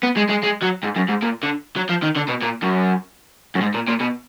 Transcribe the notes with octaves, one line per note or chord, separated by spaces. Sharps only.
B3
G#3
G#3
G#3
F#3
G#2
F#2
G#2
A#2
D3
F#3
F3
D#3
D3
B2
A#2
F#2
F#2
G#2
A#2
A#2
B2